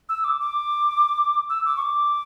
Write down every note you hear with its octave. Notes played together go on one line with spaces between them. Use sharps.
E6
D6
D6
E6
D6
C#6
D6